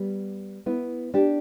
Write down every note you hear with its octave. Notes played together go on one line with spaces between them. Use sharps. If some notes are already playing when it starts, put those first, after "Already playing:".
Already playing: G3 B3
B3 E4
D4 G4